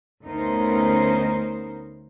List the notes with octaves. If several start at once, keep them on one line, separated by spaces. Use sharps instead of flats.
D2 B3 C#4 D#4 A#4 C5